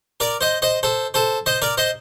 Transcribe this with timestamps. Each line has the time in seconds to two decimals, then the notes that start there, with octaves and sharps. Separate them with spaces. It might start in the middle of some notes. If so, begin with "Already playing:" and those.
0.20 A#4 D5
0.41 C5 D#5
0.62 C5 D#5
0.83 A4 C5
1.14 A4 C5
1.46 C5 D#5
1.62 A#4 D5
1.78 C5 D#5